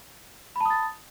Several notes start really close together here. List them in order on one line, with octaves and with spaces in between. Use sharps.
B5 A5 D#6 A6